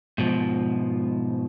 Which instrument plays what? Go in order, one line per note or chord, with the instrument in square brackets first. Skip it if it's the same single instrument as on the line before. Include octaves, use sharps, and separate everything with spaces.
[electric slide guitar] G#2 B2 F3